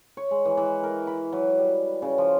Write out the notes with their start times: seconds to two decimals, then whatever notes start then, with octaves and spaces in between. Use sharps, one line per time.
0.17 C#5
0.31 G#3
0.45 E3
0.57 E3
0.83 A#4
1.07 B5
1.32 F#3
1.58 G3
2.02 C#3
2.18 F3